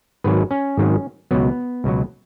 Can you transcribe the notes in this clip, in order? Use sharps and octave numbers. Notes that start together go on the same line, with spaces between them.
G#1 G#2 D#3 F#3 B4
C#4
G#1 G#2 D#3 F#3
C#2 B2 F#3 B3
C#2 B2 F#3